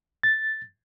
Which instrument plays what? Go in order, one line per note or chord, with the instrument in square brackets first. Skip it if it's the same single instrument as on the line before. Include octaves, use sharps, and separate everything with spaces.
[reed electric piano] A6